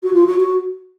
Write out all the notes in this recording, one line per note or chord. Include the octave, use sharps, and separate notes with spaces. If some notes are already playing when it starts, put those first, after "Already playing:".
F#4
F4
F#4
F#4